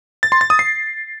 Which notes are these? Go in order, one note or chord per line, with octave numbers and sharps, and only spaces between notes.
A6
C6
A6
D#6
C7